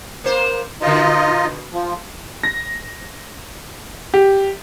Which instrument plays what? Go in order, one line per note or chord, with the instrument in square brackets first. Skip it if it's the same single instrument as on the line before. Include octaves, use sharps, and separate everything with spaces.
[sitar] A#3 C5
[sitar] B2 D3 [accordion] D#4 F4 D#5
[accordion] F3
[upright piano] A#6
G4